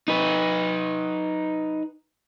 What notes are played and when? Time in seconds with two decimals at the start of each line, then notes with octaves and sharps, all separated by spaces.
0.08 D#4 B4